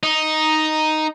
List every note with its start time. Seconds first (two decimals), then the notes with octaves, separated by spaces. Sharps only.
0.03 D#4